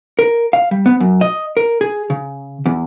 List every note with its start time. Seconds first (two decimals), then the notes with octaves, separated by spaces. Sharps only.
0.19 A#4
0.53 F5
0.71 G3
0.86 B3
1.00 F#2
1.21 D#5
1.57 A#4
1.81 G#4
2.10 C#3
2.66 E2